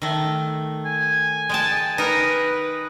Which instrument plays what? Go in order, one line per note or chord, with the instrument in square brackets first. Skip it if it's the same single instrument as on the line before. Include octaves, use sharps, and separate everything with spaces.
[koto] D#3 A3
[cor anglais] G#5
[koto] G#3 G5 A5
[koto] D#4 A#4 [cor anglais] B4